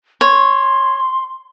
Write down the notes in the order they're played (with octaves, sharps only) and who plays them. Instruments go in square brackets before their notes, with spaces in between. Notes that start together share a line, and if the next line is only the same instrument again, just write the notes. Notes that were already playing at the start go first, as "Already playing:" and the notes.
[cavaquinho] C#5 [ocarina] C6